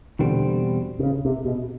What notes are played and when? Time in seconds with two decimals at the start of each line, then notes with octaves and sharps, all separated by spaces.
0.19 E2 B2 D3 G3 C4
0.99 C3
1.03 C#3
1.25 C3
1.45 B2